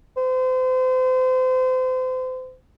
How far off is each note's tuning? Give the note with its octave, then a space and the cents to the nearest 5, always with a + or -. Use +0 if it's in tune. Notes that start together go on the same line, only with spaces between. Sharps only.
C5 -35